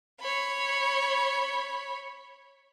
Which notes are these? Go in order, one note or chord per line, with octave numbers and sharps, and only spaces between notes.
C#5 B5